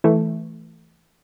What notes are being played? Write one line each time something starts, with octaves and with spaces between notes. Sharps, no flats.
E3 A3